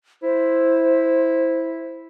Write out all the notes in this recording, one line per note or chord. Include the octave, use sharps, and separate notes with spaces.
E4 C5